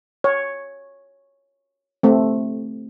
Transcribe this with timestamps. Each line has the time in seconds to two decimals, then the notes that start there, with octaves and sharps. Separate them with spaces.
0.24 C#5
2.03 A3 C4